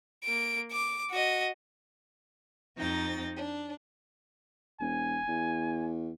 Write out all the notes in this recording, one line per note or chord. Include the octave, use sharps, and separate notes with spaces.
A#3 D7
D6
F#4 D#5
F2 C4 D#4 G5 A#5 A6
D4
E1 G#5
E2